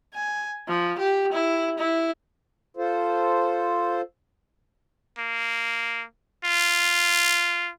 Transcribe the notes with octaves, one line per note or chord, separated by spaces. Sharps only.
G#5
F3
G4
E4
E4
F4 A4 C5
A#3
F4